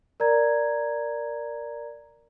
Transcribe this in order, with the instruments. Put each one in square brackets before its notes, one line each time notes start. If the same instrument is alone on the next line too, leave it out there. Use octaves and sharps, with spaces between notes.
[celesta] A#4 D5 A#5 G#6